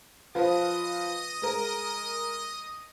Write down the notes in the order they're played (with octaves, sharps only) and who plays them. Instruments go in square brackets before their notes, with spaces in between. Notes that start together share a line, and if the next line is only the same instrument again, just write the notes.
[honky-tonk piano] F3 F4 B4 [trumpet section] D#5 D#6
[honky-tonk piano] G#3 A#4